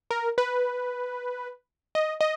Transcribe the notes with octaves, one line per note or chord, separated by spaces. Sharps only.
A#4
B4
D#5
D#5